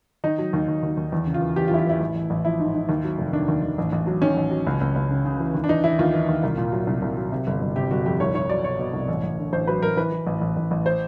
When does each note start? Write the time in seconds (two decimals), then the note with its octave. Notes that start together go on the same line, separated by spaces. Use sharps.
0.24 D#3 D#4
0.38 F#3
0.53 D#2
0.68 D#2
0.83 D#2
0.97 D#2
1.12 E2
1.27 C#3
1.34 F4
1.42 E3
1.56 E2 G4
1.68 F4
1.71 E2 E4
1.78 F4
1.86 E3 E4
2.00 A1
2.15 A1
2.30 A1
2.45 F3 E4
2.60 G#2
2.74 G#2
2.89 D#2
3.04 F#3
3.18 F1
3.33 D#3 D4
3.48 D#2
3.63 D#2
3.78 A1
3.92 A1
4.07 F#3
4.22 D#3 C#4
4.37 A1
4.51 F#3
4.67 C#2
4.81 C#2
4.96 C#2
5.11 C#3
5.26 C#3
5.40 E3
5.54 D#2
5.64 D4
5.69 E3 D#4
5.84 E3 E4
5.99 D#2 F4
6.14 E3
6.29 D#2
6.43 C2
6.58 A#2
6.72 F#3
6.87 C2
7.02 C2
7.17 F#3
7.32 C3
7.47 G1
7.61 G1
7.76 C3 G4
7.91 G1 F#4
8.06 F2 G4
8.20 C2 C#5
8.35 C2 C#5
8.49 F#3 D5
8.64 B2 C#5
8.79 B2
8.93 C2
9.08 A1
9.23 A1
9.38 D3
9.53 A1 C5
9.67 F#3 B4
9.82 A1 A#4
9.97 E3 B4
10.12 E3
10.27 A1
10.41 A1
10.57 A1
10.71 A1
10.86 C5